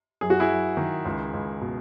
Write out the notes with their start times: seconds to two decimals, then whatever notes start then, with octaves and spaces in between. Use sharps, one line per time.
0.21 F#2 G#4
0.30 F#4
0.40 E4 G#4
0.49 F#2
0.77 D#3
1.05 C#2
1.34 C#2
1.61 B2